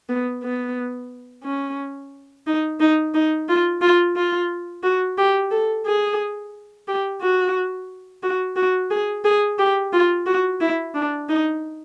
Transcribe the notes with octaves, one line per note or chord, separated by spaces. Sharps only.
B3
B3
C#4
D#4
D#4
D#4
F4
F4
F4
F#4
G4
A4
G#4
G4
F#4
F#4
F#4
G#4
G#4
G4
F4
F#4
E4
D4
D#4